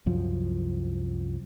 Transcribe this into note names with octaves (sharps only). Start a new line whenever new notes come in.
C2 F#2 F3